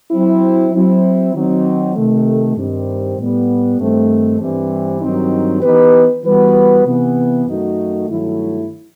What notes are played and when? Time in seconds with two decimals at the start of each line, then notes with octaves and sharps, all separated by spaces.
0.12 F#3 C4 E4
0.73 F#3 C4 E4
1.34 D#3 F#3 C4 D#4
1.95 C3 D#3 A3
2.57 G2 D#3 G3 C4
3.18 A2 G3 B3
3.79 G2 D#3 A3 C4
4.40 G2 E3 G3 C4
5.02 G2 D#3 F#3 C4 D#4
5.62 E3 B3 D#4 G4 B4
6.24 E3 G3 B3 F#4 B4
6.85 C3 E3 B3
7.47 F#2 D#3 A3 D#4 F#4
8.08 G2 D#3 F#3 A3 E4